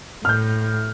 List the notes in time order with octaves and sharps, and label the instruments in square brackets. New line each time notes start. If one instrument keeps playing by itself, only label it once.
[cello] A2 [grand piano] F6 G6